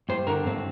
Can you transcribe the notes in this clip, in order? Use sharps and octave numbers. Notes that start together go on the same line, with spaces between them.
G2 C5
D3 A#4
G2 C4